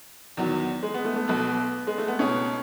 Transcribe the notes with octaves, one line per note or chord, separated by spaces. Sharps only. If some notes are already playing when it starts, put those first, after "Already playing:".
E2 D#3 F#3 B3
G#3
B3
A3
A3
B1 B2 A3 B3
G#3
A3
B3
C#2 B2 A3 C#4 D#4